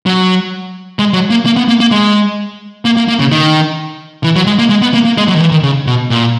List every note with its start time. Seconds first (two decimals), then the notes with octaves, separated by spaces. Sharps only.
0.06 F#3
0.99 G#3
1.13 F#3
1.30 A#3
1.46 A#3
1.56 B3
1.68 A#3
1.80 A#3
1.91 G#3
2.85 A#3
2.97 A#3
3.08 A#3
3.20 C#3
3.31 D#3
4.24 E3
4.36 F#3
4.47 G#3
4.59 A#3
4.70 G#3
4.82 B3
4.94 A#3
5.05 A#3
5.17 G#3
5.28 F#3
5.35 D#3
5.40 E3
5.51 D#3
5.63 C#3
5.87 B2
6.10 A#2